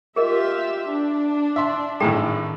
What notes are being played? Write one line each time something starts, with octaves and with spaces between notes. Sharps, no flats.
F4 G4 G#4 A#4 D#5 E5
D4
E5 C6
G#1 A2 G#3 A4 G5 A#5